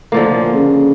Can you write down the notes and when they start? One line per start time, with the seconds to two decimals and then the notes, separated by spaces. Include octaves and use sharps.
0.12 A2 D3 F3 A#3
0.33 A#2
0.54 C#3